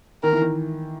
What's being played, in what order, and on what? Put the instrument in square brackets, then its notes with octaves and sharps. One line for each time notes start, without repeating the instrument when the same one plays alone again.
[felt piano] D#3 [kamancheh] A#4
[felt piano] E3
D#3